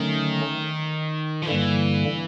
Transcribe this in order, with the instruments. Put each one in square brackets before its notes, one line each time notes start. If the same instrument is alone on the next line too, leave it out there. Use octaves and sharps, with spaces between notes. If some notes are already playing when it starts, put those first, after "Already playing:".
Already playing: [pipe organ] D3 F#3 A3 C#4 [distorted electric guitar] D#3
[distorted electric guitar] F3
[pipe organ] G2 D3 G3 A#3 [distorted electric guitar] E3